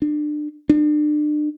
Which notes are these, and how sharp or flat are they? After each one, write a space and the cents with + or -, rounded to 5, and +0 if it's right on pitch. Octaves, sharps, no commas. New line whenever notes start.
D4 +30
D4 +35